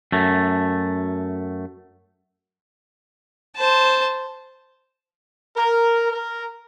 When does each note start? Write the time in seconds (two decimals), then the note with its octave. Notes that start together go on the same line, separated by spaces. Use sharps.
0.12 F#2 A3
3.56 C5 A5
5.57 A#4
6.12 A#4